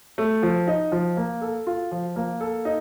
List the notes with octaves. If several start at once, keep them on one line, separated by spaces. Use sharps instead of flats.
A3
F3
D#4
F3
A#3
A4
F4
F3
A#3
A4
D#4